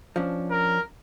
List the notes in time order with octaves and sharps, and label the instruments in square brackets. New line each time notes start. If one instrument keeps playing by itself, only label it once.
[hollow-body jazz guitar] F3 C#4 D4
[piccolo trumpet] A#4